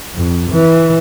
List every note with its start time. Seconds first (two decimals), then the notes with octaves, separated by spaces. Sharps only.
0.15 F2
0.51 E3